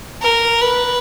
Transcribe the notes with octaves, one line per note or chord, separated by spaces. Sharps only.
A#4
B4